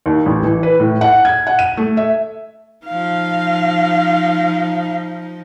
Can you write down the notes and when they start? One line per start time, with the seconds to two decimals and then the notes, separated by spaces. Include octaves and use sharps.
0.06 D#2
0.26 A1
0.44 E3
0.63 B4
0.80 A2
1.01 F#5
1.25 G#6
1.47 F#5
1.59 D#7
1.77 A3
1.97 E5
2.86 F3 D#4 F5